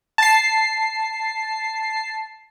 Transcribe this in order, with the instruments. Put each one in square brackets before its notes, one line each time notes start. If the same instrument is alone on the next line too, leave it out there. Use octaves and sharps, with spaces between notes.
[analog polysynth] A5 C7